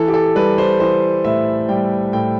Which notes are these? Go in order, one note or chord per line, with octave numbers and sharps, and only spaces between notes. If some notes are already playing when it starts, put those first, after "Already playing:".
Already playing: E3 A4
G4
A4
G3 B4
C5
E3 C5
A2 E5
G3 G5
A2 G5